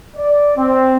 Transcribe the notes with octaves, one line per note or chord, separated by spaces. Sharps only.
D5
C4